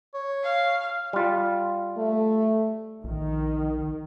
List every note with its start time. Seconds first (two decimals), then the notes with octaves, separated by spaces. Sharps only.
0.14 C#5
0.44 F5
1.13 G3 F4
1.97 A3
3.04 A#1 D#3